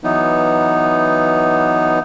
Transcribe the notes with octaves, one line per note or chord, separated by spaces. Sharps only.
E3 F#3 B3 D#4